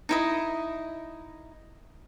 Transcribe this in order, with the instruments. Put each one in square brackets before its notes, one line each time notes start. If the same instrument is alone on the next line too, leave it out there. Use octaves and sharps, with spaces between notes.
[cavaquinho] D#4 E4 D#5